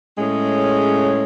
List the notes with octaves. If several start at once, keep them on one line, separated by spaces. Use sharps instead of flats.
A2 G#3 C#4 G#4